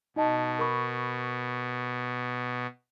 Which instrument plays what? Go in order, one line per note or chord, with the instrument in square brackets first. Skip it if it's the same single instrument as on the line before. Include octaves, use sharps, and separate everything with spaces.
[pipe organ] B2 [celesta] D#4 D#5 A5
[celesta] A#4 B5 C#6